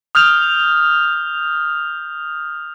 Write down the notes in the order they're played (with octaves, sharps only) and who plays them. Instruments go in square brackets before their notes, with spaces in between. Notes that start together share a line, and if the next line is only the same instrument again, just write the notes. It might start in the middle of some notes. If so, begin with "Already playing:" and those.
[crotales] D#6 F6 G6 F7